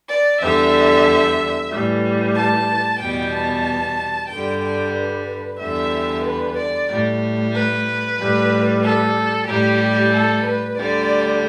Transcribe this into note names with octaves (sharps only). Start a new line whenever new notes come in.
D5
E2 D3 G3 E5
A2 E3 G3
A5
E2 B2 G3 G5
A5
G2 D3 G3 G5
G5
B4
E2 D3 G3 E5
B4
D5
A2 G3
B4
A2 G3
A4
A2 G3 G4
A4
B4
D2 D3 G3 D5